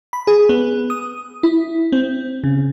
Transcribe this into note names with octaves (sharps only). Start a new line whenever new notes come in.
B5
G#4
B3
D#6
E4
C4
C#3